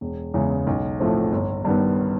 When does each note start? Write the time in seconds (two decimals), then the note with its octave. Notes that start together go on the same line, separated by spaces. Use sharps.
0.01 E1
0.34 E2 C#3 E3 G#3
0.67 B1
0.99 A2 F3 A3 C4
1.32 G1
1.65 G2 D#3 G3 B3